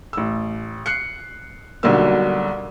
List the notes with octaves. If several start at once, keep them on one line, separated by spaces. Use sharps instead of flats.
A1 E6
F#6 C7 C#7
B1 D3 F#3 G3 A#3 E6